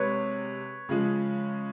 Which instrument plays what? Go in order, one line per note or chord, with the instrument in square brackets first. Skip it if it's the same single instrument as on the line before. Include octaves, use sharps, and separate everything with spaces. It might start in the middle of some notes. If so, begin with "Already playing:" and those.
Already playing: [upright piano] C3 G#3 [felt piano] B4 C#5
[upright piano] C#3 F3 G#3